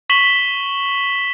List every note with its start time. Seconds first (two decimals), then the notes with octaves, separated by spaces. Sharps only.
0.10 C#6 B6 E7 F#7 G7